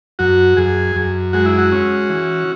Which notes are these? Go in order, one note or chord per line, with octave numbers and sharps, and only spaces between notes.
F#2 F#4
F#2 G#4
F#2
G#3 F#4
E4
F#4
C#4
E3